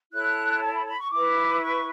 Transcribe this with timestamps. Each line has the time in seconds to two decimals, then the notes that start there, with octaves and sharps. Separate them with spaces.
0.12 E4 A4 C#5 F#6
0.62 A5
0.74 B5
0.86 B5
0.99 C#6
1.11 E4 B4 D6
1.60 C#6